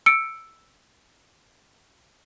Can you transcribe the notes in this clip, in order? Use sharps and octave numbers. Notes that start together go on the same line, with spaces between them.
E6 C#7 D7